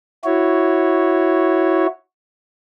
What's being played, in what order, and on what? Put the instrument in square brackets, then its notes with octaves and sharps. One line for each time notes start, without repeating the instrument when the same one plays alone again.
[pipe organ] E4 F#4 C#5